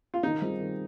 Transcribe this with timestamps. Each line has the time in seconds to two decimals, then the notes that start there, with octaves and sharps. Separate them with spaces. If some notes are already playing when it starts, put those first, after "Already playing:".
0.14 F4
0.23 D#3 D#4
0.42 G3 C4 F4 G#4
0.60 D#3